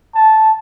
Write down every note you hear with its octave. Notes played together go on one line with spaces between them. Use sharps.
A5